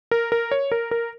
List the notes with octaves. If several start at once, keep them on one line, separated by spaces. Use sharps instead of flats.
A#4
A#4
C#5
A#4
A#4